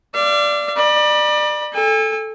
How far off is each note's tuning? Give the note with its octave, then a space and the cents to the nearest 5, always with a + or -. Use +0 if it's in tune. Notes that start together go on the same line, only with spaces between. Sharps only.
D5 +0 F5 -40
D5 +30 B5 -40
A4 -5 G#5 -40